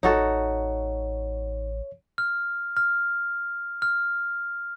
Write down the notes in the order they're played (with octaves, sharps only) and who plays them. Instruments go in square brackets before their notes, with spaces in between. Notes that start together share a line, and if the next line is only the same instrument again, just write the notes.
[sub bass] A1 [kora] D#4 F#4 A4 [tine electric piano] C#5
[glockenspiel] F6
F6
F6